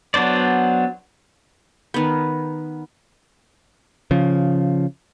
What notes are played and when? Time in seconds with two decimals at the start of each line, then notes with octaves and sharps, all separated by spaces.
0.14 F#3 B3 D4 C5 D5
1.94 D#3 B3
4.11 C#3 F3